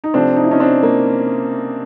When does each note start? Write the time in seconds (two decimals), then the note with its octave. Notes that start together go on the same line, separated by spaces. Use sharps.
0.04 D#4
0.14 C3 F3 A3 C4 D4
0.36 D#4
0.43 E4
0.51 C#4 D#4
0.60 C4 D4
0.83 A#3